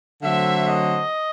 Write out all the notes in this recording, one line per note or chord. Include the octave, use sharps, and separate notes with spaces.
D3 F#3 A3 C4 E5
D#5